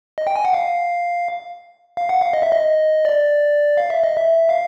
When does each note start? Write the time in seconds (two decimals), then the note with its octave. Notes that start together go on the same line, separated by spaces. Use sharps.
0.18 D#5
0.27 G5
0.36 G#5
0.45 F#5
0.53 F5
1.97 F5
2.09 F#5
2.21 F5
2.33 D#5
2.42 E5
2.52 D#5
3.05 D5
3.77 F5
3.90 E5
4.04 D#5
4.17 E5
4.49 F5